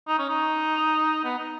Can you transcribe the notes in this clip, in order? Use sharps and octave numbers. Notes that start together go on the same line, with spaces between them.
D#4
C#4
D#4
B3
D#4